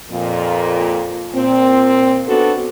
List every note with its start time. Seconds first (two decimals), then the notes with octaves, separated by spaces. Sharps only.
0.10 F2 A#2
1.34 A#2 C4
2.27 B3 D4 F#4 A4